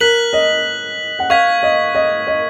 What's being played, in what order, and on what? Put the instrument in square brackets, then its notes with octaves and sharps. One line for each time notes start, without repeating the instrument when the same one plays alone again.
[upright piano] A#4 [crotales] F#6 B6 F#7
[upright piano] D#5
F#5
[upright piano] F5 [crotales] C#6 G#6 B6
[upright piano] D#5
D#5
D#5